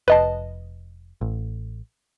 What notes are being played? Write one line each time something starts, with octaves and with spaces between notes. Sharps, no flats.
F1 B4 D#5 A5
A1